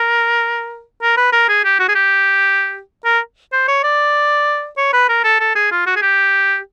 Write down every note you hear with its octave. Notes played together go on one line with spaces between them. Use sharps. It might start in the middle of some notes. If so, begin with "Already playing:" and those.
Already playing: A#4
A#4
B4
A#4
G#4
G4
F#4
G#4
G4
A#4
C5
C#5
D5
C#5
B4
A#4
A4
A4
G#4
F4
F#4
G#4
G4